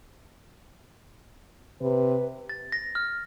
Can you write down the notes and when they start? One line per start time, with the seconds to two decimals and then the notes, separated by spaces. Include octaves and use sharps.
1.82 C3 B4
2.49 A6
2.72 A#6
2.95 F6